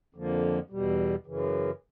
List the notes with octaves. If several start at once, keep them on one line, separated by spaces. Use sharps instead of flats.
F2 D3 F3 A#3
E2 B2 G3
F#2 C#3 E3